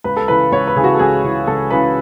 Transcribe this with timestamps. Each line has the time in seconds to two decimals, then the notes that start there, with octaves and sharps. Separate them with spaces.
0.04 C#2 B4
0.17 A4
0.28 C#3 E3 B4
0.52 C#2 C#5
0.67 B4
0.76 C#3 E3 G#4
0.84 F#4
0.94 A4
0.99 C#2 G#4
1.24 C#3 E3
1.47 C#2 A4
1.70 C#3 E3 B4